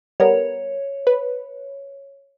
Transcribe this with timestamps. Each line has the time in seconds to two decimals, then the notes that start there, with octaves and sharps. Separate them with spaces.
0.20 G3 B3 A#4 C#5
1.07 B4